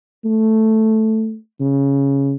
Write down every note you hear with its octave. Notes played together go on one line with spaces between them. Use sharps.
A3
C#3